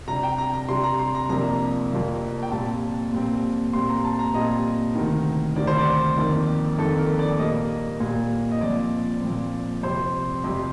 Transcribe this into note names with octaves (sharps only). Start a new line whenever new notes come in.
C3 G3 D4 A#5
G5
A#5
A#5
C3 G3 D4 C6
A#5
C6
A#5
F2 C3 F3 A#3 D4 A#5
F2 C3 F3 A#3 D4
G5
A#2 G3 C4 A5
A#2 G3 C4
A#2 G3 C4 C6
A#5
A5
A#5
A#2 G3 C4 D#5
D2 C3 D#3
D2 C3 D#3 D5
C5
D5
F2 D#3 A#3
F2 D#3 A#3 A4
A#4
D5
A#2 G3 A#3 D#5
A#2 G3 A#3
D#5
A#2 F3 C4 D5
A#2 F3 C4
F2 C3 G3 C5
F2 C3 G3